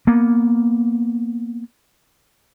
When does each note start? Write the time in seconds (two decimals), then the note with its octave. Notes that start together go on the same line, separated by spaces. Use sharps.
0.07 A#3 B3